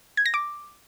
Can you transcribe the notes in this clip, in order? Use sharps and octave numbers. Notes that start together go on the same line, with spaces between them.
G#6
A#6
D6